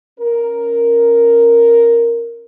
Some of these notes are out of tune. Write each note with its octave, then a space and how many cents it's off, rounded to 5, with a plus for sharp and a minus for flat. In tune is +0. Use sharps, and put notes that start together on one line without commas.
C#4 +0 A#4 +0